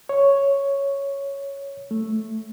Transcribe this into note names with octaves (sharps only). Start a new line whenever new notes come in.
C#5
A3